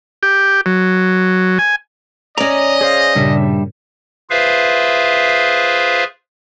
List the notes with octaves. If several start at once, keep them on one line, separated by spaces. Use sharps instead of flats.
G4
F#3
G#5
C#4 D5 D#5 A#5
G#4 C5 F5
G2 A#2 C#3 G3 D4 E5
F4 G#4 B4 C5 E5 F5